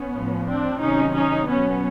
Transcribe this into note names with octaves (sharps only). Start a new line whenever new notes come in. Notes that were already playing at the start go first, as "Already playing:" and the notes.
Already playing: B3 C#4
A2 F3
C4 D4
C3 D#3 F#3 C#4 D#4
C#4 D#4
B2 F#3 B3 C#4